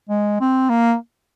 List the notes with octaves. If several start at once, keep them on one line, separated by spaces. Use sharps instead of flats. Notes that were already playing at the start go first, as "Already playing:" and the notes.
G#3
C4
A#3